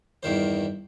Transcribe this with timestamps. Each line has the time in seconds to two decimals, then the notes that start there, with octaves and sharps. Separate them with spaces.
0.23 E2 G2 D#3 C5